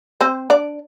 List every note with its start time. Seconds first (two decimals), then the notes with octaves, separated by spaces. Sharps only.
0.21 C4 C5
0.50 D4 D5